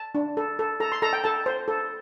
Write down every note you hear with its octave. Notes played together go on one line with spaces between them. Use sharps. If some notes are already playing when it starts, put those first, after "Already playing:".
Already playing: A5
D4
A4
A4
A4 A#5
C6
A4 A#5
G5
A4 A5
C5
A4